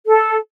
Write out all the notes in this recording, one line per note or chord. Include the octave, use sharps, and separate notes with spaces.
A4